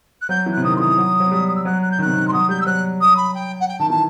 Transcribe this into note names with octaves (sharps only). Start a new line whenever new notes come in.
F#6
F#3 G6
E3
C3 F#6
D#3 D#6
C6
E3 D#6
F#3
F#3
G3
D#6
E6
F#3 F#6
F#6
G6
D#3
C3 F#6
D#3
C6
F#3 D#6
G3 G6
E6
F#3 F#6
D#6
B5
G5
F#5
G5
D#3 A5
E3 A5